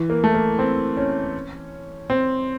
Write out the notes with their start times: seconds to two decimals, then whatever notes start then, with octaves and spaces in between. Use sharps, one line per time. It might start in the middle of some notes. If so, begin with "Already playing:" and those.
Already playing: E3
0.10 A#3
0.24 A3
0.34 A#3
0.59 C4
0.97 C#4
2.10 C4